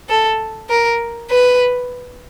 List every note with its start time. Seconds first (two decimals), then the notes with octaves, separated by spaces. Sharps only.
0.09 A4
0.70 A#4
1.30 B4